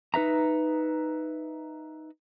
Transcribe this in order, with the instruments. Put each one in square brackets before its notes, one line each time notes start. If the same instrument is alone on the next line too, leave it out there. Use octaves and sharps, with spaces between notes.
[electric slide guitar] D#4 B4 E5 A#5